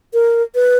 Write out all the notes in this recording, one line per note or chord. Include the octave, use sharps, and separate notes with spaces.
A#4
B4